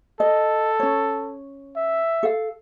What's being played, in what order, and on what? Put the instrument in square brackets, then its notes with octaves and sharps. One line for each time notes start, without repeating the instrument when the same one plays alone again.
[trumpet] A4 [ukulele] D#5
[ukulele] C#4 C#5
[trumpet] E5
[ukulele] A4 F5